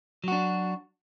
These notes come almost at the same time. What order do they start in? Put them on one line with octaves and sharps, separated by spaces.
F#3 F#4 D4